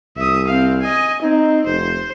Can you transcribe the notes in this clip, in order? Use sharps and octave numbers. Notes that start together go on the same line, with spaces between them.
C2 E5 D#6
C4 F5
D#5 G#5
C4 D#4
F1 C5